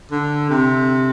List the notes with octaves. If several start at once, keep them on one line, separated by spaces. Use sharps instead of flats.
D3
C3